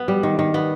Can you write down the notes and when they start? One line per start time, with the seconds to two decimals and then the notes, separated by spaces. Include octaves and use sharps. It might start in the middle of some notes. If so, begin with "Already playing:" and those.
Already playing: B3
0.08 G3
0.23 D#3
0.39 D#3
0.54 B3